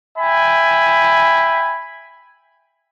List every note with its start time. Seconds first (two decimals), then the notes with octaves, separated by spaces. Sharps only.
0.18 E5 G5 G#5 B5